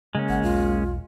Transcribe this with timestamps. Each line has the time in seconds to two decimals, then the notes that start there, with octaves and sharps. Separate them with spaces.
0.15 C#3 G#3 A#3 C#4
0.29 G#1 F#5
0.43 E1 B1 F4